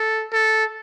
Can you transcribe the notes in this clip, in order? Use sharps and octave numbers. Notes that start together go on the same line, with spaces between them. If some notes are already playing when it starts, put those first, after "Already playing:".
Already playing: A4
A4